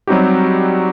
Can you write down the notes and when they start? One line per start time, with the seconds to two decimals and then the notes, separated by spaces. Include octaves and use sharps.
0.07 F#3 G3 C4 D#4 F#4 G4